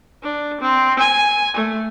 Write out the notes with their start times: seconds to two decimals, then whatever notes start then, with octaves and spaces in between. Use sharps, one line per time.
0.23 D4
0.61 C4
0.99 G#5
1.57 A3